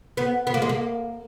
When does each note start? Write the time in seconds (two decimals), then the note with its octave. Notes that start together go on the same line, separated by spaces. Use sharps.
0.17 B3
0.47 B3
0.54 A#3
0.62 G#3
0.69 A#3